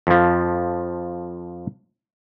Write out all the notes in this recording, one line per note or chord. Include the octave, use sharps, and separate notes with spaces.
F2 F3